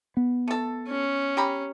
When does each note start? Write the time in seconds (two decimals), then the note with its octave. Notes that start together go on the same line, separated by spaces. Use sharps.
0.17 B3
0.48 A3 A4
0.88 C#4
1.37 G4 A#5 B5